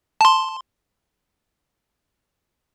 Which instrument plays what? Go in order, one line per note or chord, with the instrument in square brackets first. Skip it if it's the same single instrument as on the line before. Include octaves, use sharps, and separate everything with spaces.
[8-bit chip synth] A5 C6